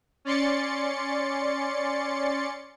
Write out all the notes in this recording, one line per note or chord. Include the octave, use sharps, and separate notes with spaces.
C#4 D5 C6 A6 C#7